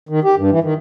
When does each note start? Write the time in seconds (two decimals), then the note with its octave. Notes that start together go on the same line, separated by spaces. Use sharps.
0.09 D#3
0.24 G4
0.38 G2
0.51 E3
0.63 D#3